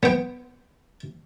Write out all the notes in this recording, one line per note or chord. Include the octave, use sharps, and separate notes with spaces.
B3 G5